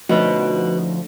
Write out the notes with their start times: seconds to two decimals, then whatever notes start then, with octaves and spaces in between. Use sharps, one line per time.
0.09 D2 F3 C#4 D#4 F#4 B4